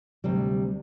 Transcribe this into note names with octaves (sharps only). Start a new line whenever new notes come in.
D2 C3 G3